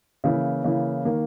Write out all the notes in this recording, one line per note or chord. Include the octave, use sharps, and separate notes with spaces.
C#3 E3 A#3 E4
C#3 E3 A#3 E4
D#3 A#3